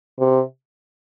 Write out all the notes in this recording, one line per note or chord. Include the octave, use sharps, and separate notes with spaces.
C3